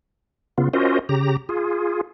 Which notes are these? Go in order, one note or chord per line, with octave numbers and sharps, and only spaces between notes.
C#3 B3 F4
C#4 F4 F#4 A#4 C5 D#5
C#3 G4 A#5
F4 G#4